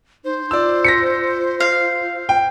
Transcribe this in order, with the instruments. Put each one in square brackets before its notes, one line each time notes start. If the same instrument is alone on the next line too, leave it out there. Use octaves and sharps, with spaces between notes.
[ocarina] D#4 [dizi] C5
[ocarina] F4 [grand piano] D5 E6
[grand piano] A#6 B6 C#7
[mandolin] F5
[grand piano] G5